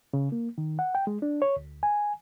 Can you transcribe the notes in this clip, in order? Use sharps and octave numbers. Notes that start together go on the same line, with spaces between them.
C#3
A#3
D#3
F#5
G5
G#3
D4
C#5
D2
G#5